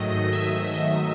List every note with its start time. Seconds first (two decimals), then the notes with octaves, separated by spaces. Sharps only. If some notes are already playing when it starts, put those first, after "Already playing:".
Already playing: G#2 D#3 F#3 A3 D#5
0.12 D#5
0.32 E5
0.73 D#5